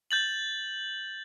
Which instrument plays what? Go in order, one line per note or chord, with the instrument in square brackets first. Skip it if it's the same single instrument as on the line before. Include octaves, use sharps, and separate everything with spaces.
[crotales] G6 A6 F#7